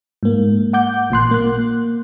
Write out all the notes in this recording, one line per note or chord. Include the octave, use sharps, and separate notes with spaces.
G#2 A#3
F#5 D6 G6
A1 A#2 C6 F#6
A#3 F#6